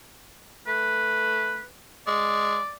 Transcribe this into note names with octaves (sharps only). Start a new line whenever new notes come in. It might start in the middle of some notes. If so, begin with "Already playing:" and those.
A3 B4
G#3 D5